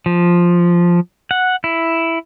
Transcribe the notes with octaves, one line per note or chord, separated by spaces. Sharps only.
F3
F#5
E4